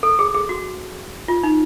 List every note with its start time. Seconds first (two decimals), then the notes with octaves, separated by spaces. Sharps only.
0.03 A4
0.19 G#4
0.34 G#4
0.49 F#4
1.28 F4
1.43 D#4